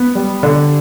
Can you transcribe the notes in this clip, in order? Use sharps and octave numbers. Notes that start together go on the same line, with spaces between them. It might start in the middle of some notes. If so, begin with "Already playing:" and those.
Already playing: B3
G3
D3